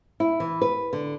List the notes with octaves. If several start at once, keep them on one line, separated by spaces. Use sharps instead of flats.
E4
E3
B4
D3